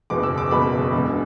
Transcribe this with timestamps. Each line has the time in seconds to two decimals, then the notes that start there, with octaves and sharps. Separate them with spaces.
0.10 F#1 E2 B2 D6
0.23 E6
0.38 D6
0.51 F#1 E2 B2 B5
0.92 E1 E2 D3